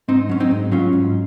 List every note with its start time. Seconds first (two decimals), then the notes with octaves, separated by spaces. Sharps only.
0.08 G#2 C4 D#4
0.29 F#3 C#4
0.40 C4 D#4
0.51 G#2
0.71 F#3 C#4 F4
0.93 G#2